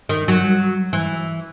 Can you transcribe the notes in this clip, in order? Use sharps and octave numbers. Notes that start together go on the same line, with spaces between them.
D#3
F#3
E3